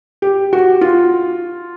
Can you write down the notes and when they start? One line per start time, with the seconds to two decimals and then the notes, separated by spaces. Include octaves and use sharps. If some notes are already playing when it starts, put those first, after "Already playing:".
0.22 G4
0.53 F#4
0.81 F4